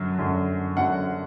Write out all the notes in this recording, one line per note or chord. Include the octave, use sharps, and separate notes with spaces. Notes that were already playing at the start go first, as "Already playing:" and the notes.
Already playing: F#2 D3 F#3
F#2 D3 F#3
F#2 D3 F#3 F#5